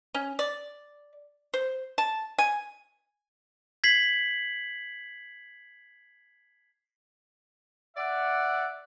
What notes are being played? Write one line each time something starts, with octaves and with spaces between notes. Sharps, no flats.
C#4
D5
C5
A5
G#5
G#6 B6 C7 F#7
D5 E5 F#5